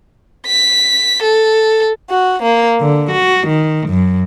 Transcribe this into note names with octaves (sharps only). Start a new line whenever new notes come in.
B6
A4
F#4
A#3
D3
F#4
D#3
F#2